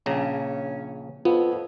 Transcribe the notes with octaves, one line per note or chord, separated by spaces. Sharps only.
A#1 C#3 C#4 A#5
F2 B3 F4